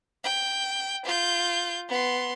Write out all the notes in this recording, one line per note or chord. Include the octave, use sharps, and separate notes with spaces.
G5
F4 G6
B3 C6